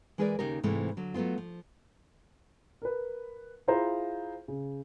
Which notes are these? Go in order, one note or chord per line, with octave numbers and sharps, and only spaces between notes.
E3 G#3 G#4 A#4 B4 D5
D#2 C#3 D#4 G4 A#4
G#2 C3 E3 G#3 A3
D3 F#3
F#3 A3 B3 C4 F4
F3
A#4 B4
E4 F4 G#4 C5 A#5
C#3